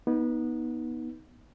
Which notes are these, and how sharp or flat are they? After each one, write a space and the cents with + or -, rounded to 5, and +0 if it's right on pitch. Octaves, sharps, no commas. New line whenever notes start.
B3 -20 D#4 +15